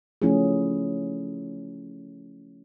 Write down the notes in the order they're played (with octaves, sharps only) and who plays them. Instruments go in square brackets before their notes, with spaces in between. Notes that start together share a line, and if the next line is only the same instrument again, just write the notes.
[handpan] F3 A3 C#4 E4 F4 G#4